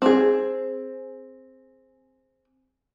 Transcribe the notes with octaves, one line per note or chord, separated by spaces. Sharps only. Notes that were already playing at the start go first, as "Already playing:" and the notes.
C4 G#4